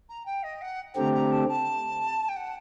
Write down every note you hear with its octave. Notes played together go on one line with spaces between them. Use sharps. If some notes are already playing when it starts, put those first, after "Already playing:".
A#5
G5
D#5
F#5
D3 A3 C4 G4 A#5
A#5
A5
A5
G5
F#5